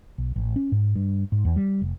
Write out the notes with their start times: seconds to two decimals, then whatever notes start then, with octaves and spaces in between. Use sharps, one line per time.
0.18 B1
0.36 A1
0.56 C#4
0.72 G#2
0.96 G2
1.32 G#2
1.45 E2
1.56 G3
1.82 F1